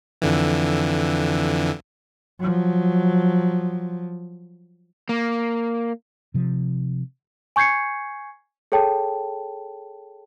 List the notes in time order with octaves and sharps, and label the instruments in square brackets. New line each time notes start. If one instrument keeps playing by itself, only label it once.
[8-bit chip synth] F2 D3 E3
[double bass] F3 F#3
[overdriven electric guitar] A#3
[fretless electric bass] C3 F3
[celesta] G#5 C#6 G6 G#6 C7 C#7
G#4 A4 C#5 G5 A5